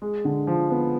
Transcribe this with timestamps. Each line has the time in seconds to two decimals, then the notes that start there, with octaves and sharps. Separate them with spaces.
0.02 G#3
0.25 D3
0.47 F3
0.70 B3